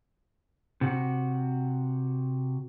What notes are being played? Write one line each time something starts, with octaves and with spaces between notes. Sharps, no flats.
C3 F#4